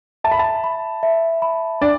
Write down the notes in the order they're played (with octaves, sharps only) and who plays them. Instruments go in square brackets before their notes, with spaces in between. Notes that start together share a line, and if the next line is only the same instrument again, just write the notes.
[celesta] E5 [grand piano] A5
[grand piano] B5
A5
[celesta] B5
E5
B5
[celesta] D4 [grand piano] D5